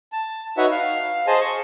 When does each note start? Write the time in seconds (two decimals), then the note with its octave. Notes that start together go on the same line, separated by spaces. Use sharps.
0.13 A5
0.57 D#4 F#4 B4 C#5 E5 F#5
0.71 F5
1.27 G#4 C5 D#5 G#5 A5
1.41 C#6